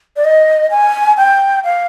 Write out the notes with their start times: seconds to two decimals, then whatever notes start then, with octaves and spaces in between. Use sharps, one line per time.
0.17 D5
0.25 D#5
0.71 G#5
1.17 G5
1.64 F5